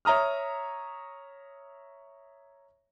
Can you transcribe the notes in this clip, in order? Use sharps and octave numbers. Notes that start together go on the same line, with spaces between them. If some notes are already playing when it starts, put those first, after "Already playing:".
C#5 E5 A#5 D#6 F6